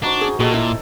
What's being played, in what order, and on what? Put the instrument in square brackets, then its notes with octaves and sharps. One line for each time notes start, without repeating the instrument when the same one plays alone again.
[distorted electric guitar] D4 [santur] D#4 F#4 C5
[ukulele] G#4
[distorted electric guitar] A#2 [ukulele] F#4 G#4 [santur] A4 D#5 G5
[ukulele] E4